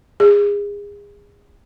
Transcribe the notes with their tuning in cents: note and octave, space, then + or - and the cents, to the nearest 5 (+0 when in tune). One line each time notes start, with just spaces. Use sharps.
G#4 -30